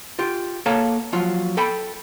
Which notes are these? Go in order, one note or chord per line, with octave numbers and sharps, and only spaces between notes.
F4 G4
A#3 A4 C#5 F5 A5 A#5
F3 F#3 F4
A4 G5 B5